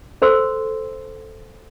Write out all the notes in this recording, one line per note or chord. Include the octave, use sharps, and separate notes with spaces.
A4 C5 C6 E6